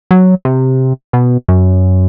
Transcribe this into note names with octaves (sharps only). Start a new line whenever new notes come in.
F#3
C3
B2
F#2